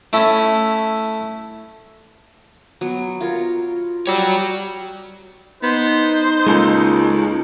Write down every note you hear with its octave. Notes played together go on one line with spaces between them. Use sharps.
A3 C#4 E4
F#3 B3
F4 A#4 C#5
G3 F#4 C#5
B3 D#4 C5
C#2 G#3 A#3 A4